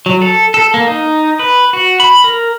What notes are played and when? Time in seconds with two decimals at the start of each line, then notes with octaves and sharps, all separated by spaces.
0.06 F#3
0.22 A4
0.54 A4
0.74 A#3
0.87 D#4
1.39 B4
1.73 F#4
2.00 B5
2.24 A#4